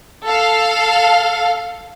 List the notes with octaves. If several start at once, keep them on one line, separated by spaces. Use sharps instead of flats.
A4 F5